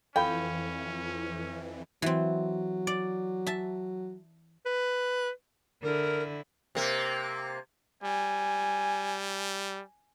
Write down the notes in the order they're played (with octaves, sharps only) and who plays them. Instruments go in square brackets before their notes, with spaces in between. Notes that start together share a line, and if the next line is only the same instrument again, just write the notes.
[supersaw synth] F2 E3 [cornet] C#4 [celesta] A4 F5 B5 [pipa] G5
[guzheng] E3 C4 [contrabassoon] F#3
[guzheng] D5
E5 A5
[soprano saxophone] B4
[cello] D3 E4 [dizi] A#4
[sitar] C3 A#3
[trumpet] G3 [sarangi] G#5